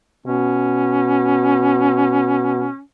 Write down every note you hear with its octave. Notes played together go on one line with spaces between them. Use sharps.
B2 C#4